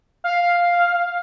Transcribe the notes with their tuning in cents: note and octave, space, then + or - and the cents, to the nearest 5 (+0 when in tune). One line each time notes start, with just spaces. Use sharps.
F5 +5